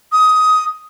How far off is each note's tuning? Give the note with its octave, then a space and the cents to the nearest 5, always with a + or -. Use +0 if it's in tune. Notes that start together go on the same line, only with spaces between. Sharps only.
D#6 +15